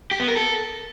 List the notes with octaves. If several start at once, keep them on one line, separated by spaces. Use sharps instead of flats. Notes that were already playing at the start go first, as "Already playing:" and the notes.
G4
B3
A#4
A4